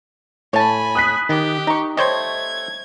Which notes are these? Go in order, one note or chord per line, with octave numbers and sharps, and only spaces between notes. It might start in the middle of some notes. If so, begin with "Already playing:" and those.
A2 C#5 G#5 A5 B5
D#6 F#6 B6
D#3 G4
D#4 A#5 C#6
G3 A3 C5 C#5 D#5 G#6